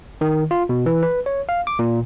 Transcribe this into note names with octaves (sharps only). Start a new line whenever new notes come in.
D#3
F4
B2
E3
B4
C#5
F5
D6
A#2